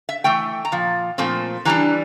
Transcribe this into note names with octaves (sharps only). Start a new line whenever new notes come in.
E5
E3 A3 G5
A#5
A#2 F3
A#2 F3 A3 C4
E3 G3 D4 A#5